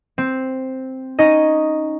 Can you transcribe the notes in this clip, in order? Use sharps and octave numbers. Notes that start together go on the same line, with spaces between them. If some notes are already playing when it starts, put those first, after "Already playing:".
C4
C#4 D#4 D#5